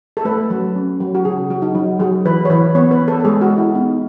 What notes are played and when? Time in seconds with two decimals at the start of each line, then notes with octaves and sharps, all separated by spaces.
0.17 A4
0.25 A3 B4
0.50 F#3
0.75 C#4
1.00 F#3
1.15 F#4
1.25 C#3 G#4
1.50 F#3 F#4
1.62 D#4
1.75 F#3 F#4
2.00 F#3 G#4
2.25 E3 B4
2.45 C#5
2.50 E3 B4
2.75 B3 C#5
2.91 B4
3.00 B3
3.08 A4
3.20 A4
3.25 G#3 G#4
3.41 F#4
3.50 G#3
3.58 E4
3.75 B3 D#4